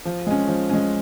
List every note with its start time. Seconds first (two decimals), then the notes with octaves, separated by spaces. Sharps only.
0.05 F3
0.27 G#3 C#4
0.48 F3
0.70 G#3 C#4